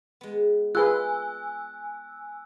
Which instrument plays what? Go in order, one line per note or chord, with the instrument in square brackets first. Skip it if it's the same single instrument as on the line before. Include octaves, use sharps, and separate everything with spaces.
[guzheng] G#3 B3
[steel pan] F4 G#4 B4 [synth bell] G#5 E6 [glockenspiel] F#6